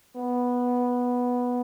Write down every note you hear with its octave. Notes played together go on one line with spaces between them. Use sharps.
B3